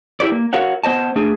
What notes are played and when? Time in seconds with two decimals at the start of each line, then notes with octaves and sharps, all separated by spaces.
0.20 E4 G4 B4 D5
0.32 A#3
0.53 F#4 A#4 C#5 F5 F#5
0.84 B3 C5 D#5 A5
1.16 A3 D4 G#4